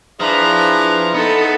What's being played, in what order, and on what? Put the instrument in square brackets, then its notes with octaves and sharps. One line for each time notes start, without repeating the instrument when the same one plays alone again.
[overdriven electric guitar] F3 [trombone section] D4 G#4 B4 [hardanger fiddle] E4 A#5
[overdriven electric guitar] B3 [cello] D#4 A4